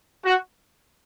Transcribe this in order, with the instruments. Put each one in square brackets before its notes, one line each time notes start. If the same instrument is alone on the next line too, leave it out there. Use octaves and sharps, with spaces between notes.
[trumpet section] F#4